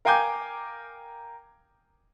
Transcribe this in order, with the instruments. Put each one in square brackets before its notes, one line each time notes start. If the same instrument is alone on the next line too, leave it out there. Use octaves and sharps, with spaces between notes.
[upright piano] A#4 F5 G5 G#5 D6 G6